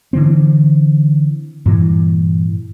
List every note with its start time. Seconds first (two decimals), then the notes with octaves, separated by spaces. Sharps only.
0.13 D3 E3 C4
1.66 G2 A#2 E3